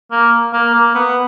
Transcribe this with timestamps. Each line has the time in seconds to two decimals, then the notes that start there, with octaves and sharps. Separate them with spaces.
0.11 A#3
0.53 A#3
0.74 A#3
0.95 B3